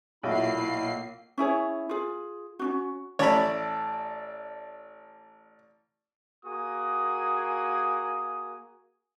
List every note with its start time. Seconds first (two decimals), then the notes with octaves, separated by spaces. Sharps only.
0.23 B1 A#2 E4 F#4 E5 F5 B5 C7
1.38 C#4 E4 G#4 C#5
1.89 F4 G#4
2.59 C#4 D4 F#4
3.19 A1 C#5 D5 A5 B5
6.46 A#3 F#4 G#4 D#6